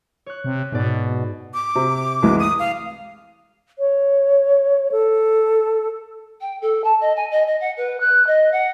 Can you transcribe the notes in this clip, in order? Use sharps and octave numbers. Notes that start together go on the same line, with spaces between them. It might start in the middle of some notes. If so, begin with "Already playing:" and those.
C#5 F#6
C3
G#2 B2 D5
D6
C3
C2 E3 G#3
D#6 D#7
F5
C#5
A4
G5
A4
A5
D#5
G#5
D#5
D#5
F#5
B4
F#6
D#5
F#5